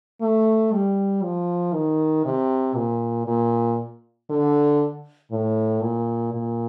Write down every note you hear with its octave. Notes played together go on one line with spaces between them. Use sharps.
A3
G3
F3
D#3
C3
A#2
A#2
D3
A2
A#2
A#2